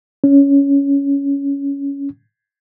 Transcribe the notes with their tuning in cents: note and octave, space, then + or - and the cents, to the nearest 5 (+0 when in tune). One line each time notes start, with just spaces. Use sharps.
C#4 +10